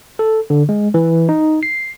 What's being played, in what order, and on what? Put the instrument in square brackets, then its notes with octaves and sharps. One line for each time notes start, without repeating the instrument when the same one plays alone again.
[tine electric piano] A4
D3
G#3
E3
D#4
C7